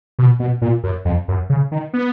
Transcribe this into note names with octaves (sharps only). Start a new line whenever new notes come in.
B2
B2
A#2
F#2
F2
F#2
C#3
D#3
B3